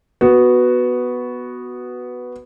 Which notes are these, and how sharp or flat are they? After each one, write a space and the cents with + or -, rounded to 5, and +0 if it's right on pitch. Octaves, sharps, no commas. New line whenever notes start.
B3 +0 F#4 +0